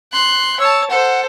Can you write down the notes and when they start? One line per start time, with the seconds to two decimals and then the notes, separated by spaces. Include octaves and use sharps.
0.12 C6 F#6
0.60 C#5 A5 E6
0.90 A4 C5 F#5